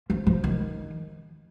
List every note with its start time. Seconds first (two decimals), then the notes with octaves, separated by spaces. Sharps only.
0.10 F3
0.27 F3
0.44 D#3